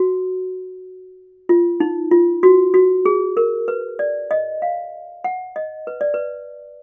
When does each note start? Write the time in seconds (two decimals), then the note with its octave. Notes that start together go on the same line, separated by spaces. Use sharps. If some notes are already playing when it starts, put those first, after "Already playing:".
Already playing: F#4
1.49 F4
1.80 D#4
2.11 F4
2.43 F#4
2.74 F#4
3.06 G#4
3.37 A#4
3.68 B4
3.99 D5
4.31 D#5
4.62 F5
5.24 F#5
5.56 D#5
5.87 B4
6.01 D5
6.14 B4